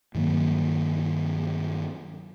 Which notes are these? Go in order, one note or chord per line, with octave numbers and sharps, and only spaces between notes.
G2 D#3 F#3 A#3